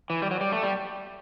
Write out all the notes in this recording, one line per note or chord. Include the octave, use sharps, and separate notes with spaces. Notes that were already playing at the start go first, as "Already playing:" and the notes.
E3
G3
F#3
G3
A3
G3